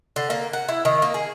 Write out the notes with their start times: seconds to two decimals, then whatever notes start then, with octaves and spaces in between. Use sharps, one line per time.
0.16 D3
0.30 A#3
0.53 F#5
0.68 E4
0.85 D#3
1.02 A#3
1.14 G#4